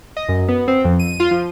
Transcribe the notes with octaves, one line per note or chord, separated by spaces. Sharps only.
D#5
F#2
B3
C4
F2
D#7
F4
F3